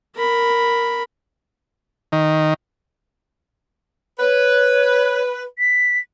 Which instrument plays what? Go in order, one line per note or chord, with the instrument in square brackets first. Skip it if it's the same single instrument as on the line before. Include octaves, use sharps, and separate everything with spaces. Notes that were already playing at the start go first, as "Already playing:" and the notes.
[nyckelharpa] A#4 B5
[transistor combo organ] D#3
[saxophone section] B4 [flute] C#5
[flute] B6